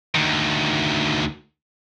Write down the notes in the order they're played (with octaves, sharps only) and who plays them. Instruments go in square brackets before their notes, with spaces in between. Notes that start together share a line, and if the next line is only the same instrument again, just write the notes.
[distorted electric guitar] D2 D#3